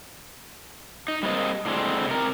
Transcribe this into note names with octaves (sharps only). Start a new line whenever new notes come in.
D#4
G3 G#3 A#3 C4 D#5
A2 D3 G#3 C4
C3 A#4